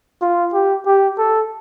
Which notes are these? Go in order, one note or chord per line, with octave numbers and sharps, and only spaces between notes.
F4
G4
G4
A4